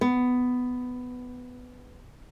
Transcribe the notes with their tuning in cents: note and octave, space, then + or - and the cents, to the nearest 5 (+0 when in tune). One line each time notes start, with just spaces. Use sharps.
B3 +10